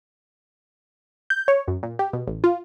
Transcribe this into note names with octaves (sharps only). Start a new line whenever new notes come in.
G6
C#5
F#2
A#2
G4
B2
A1
F4